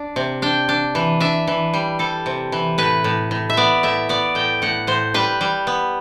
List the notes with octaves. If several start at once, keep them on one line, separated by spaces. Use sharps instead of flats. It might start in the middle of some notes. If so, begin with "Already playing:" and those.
Already playing: D4
C3
D4 G5
D4
E3
D4 E5
E3
G3
G3 A4
C3
E3
A2 B4
A2
A2
E5
B3 D5
A2 E5
B3 D5
A2 G5
A2 F#5
A2 C5
G3 B4
G3
B3